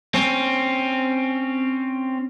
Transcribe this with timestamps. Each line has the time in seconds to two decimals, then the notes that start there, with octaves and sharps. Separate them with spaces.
0.14 C4 C#4